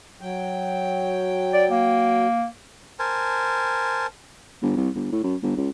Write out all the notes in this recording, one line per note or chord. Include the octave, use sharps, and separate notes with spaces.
F#3 G5
D5
A#3
A#4 C5 G#5 A5
G1
C2
G1
A2
F#2
G1
C#2